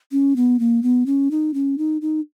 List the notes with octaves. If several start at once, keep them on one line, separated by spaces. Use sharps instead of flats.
C#4
B3
A#3
B3
C#4
D#4
C#4
D#4
D#4